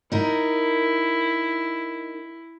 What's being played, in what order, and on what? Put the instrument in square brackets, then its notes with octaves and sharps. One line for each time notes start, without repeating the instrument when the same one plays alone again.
[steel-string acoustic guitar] D#4 A#4 [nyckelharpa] E4